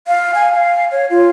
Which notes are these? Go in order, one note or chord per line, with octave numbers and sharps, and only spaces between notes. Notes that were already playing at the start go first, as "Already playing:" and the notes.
F5
G#5
F5
C#5
F4